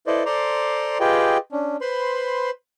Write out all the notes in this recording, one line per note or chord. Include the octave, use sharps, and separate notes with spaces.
E4 A4 B4 C5 D5 D#5
A4 C5 D5 A#5 C6 D6
F4 G4 G#4 B4 D#5 G5
C#4 D4
B4 C5 B5 C6